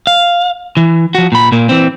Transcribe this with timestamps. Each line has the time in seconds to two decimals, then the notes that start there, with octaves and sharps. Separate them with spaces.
0.07 F5
0.77 E3
1.15 F3 F#4
1.32 A#2 B5
1.52 A#2 A#3
1.69 E3 C4